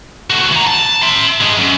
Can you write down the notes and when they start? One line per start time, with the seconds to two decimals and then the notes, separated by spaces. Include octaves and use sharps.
0.30 A3 F#4
0.52 E3 A#5
0.67 A5
1.02 E5 C6
1.40 G2 G#3
1.57 F#2